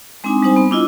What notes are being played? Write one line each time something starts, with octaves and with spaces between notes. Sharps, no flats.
G#3 C4 D4 D#4 G#5 D#6
G3 C4 D#4 C5 G#5
B3
D4 E4 F4 D#5